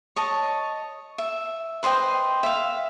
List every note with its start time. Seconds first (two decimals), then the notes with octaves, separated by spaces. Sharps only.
0.16 C#5 D#5 A5
1.18 E5
1.83 B4 C5 D#5 G5
2.43 E5 F5